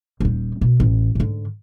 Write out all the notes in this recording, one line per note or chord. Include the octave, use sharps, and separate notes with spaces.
D#1 D#4
B2
A1
G#2 D3